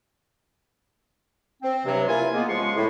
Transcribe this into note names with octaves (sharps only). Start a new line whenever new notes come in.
C4
G2 C3 F#3
A#3 E4 F4 G#5
G#3 A#3 B3
C#2 F3 G#3 C6 C#6
A2